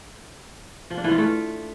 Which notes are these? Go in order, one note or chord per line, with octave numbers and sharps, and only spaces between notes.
F3
D4
E3
F4
A3